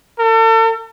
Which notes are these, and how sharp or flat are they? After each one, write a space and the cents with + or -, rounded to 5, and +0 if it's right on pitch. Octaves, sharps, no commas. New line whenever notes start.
A4 +40